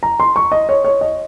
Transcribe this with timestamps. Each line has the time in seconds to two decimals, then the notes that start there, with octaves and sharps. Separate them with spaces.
0.03 A#5
0.20 C6
0.36 C#6
0.52 D#5
0.69 C#5
0.85 C#5
1.01 D#5